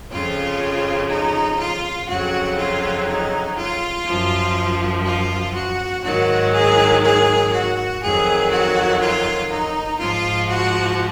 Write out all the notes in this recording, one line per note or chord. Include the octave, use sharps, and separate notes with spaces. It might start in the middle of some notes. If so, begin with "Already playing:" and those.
F2 C#3 F3 F4
D#4
F4
F2 C#3 F#3 F#4
F4
D#4
F4
F#2 F3
F4
F#4
G#2 D#3 F#3 F#4
G#4
G#4
F#4
F2 D#3 F#3 G#4
F#4
F4
D#4
G#2 F3 F4
F#4